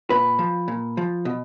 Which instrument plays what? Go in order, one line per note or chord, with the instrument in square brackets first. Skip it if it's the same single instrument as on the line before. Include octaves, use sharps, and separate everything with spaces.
[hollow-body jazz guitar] A#2 B4
F3
A#2
F3
B2